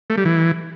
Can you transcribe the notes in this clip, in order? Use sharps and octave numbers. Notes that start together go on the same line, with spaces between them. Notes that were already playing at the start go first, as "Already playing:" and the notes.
A3
G3
E3